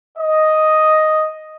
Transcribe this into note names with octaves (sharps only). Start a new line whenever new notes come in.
D#5